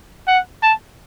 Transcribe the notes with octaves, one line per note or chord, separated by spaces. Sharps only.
F#5
A5